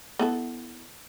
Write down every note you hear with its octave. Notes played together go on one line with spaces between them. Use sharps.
B3 E4 A4